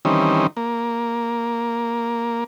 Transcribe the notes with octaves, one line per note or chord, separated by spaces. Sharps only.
D#3 E3 G3 C4 C#4 D#4
A#3